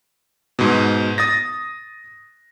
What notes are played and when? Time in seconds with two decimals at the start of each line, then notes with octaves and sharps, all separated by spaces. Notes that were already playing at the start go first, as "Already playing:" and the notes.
0.59 G#2 B2
1.18 D#6 A6 A#6